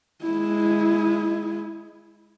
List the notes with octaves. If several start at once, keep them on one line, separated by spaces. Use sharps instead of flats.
G#3 E4